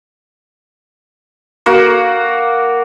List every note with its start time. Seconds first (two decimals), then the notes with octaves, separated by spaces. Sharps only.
1.66 A#3 F#4